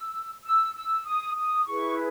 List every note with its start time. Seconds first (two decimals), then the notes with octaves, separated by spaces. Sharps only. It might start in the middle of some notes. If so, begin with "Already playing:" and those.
Already playing: E6
0.43 E6
0.74 E6
1.05 D#6
1.35 D#6
1.66 E4 G#4 B4 C#6